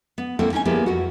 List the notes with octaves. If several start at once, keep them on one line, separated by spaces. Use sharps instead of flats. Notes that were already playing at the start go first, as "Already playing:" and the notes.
B3
A#3 C4 E4 A4 F#5
C#4 D#4 E4 G#5
F3 G3 A#3 B3 E4 G#4
F2 F#4